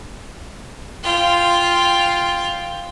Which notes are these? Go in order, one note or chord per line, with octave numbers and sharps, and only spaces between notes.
F4 G5